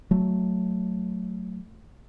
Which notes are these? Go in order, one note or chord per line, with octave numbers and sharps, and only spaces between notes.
F#3 A3